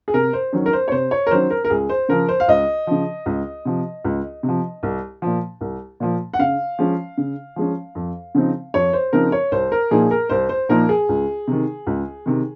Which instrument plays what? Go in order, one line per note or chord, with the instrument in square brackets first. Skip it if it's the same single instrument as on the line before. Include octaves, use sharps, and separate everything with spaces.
[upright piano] G#4
C3 A#4
C5
D#3 F#3 C#4
A#4
C5
C#5
C3 C5
C#5
A#4
D#3 F#3 C#4 C5
A#4
A#4
C#2 G#4
C5
C#3 F3 A#4
C5
F5
C#2 D#5
C#3 F3
C#2
C3 F3
C#2
C3
F3
C2
A#2 F3
C2
A#2 F3
F#5
C#3 F5
F3 G#3 C#4
C#3
F3 G#3 C#4
F2
C#3 F3 C4 D#4
F2 C#5
C5
C#3 F3 C4 D#4 A#4
C#5
C2 C5
A#4
A#2 F3 A#3 D#4 G#4
A#4
C2 C5
C5
A#2 F3 A#3 D#4 A#4
G#4
C#2
C3 D#3
C#2
C3 D#3